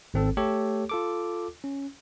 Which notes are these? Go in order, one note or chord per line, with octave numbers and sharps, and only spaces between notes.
G#1 C4 A4
A3 G4 A4 C#5
F4 A4 D6
C#4